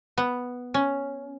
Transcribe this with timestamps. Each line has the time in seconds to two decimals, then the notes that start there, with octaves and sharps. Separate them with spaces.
0.18 B3
0.74 C#4